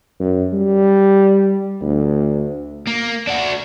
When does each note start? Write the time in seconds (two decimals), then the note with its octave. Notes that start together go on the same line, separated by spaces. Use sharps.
0.20 F#2
0.53 G3
1.82 D2
2.87 A#3
3.27 D4 F#4